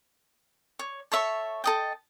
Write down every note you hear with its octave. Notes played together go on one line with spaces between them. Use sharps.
C#5
A4 C#5 E5 C#6
A4 D#5 G5